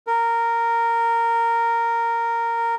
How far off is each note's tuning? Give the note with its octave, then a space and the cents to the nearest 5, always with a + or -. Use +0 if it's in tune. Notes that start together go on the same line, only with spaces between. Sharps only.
A#4 -10